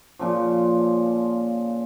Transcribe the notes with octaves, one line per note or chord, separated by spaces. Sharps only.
A#2 C#3 F3